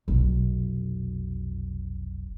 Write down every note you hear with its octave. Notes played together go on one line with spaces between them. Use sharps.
F1 B1